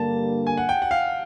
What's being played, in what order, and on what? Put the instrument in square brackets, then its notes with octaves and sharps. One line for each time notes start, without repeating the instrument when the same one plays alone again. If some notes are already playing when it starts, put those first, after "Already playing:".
Already playing: [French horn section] G2 D3 G3 A#3 [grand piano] A5
[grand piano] G#5
F#5
G5
F#5
F5